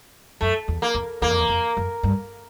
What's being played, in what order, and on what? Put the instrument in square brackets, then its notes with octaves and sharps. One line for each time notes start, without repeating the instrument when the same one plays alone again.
[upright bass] F#2 [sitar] A3
[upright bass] E2
[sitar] A#3
[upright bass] F2
[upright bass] E2 [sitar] A#3
[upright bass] F2
E2
F2
F#2
G2